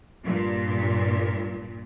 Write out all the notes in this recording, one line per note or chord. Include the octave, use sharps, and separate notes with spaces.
G2 A#2